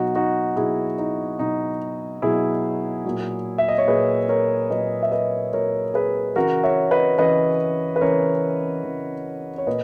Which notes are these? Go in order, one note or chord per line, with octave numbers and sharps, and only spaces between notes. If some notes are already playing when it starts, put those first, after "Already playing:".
Already playing: B2 F#3 D#4 F#4
D#4 F#4
B2 F#3 E4 G#4
D#4
B2 F#3 D#4
B2 F#3 E4 G#4
A#2 F#3
E5
D#5
C#5
A#2 F#3 G#4 B4
A#4 C#5
A#2 F#3 B4 D#5
E5
B4 D#5
A#2 F#3 A#4 C#5
G#4 B4
C#3 E3 F#4 A#4
C#5 E5
B4 D#5
C#3 E3 B4 D#5
B4
C#3 E3 A#4 C#5
C#3 E3
C#5
A#2 B4 D#5